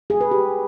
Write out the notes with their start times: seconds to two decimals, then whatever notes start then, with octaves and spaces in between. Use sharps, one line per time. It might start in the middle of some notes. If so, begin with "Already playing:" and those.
0.10 G#4
0.21 B4
0.31 G4